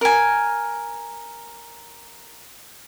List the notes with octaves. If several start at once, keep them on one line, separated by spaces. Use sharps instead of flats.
A#4 G#5